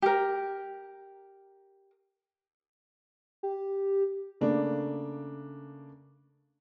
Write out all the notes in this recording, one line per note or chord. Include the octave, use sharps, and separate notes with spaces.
G4 A#4
G4
C#3 A3 A#3 D4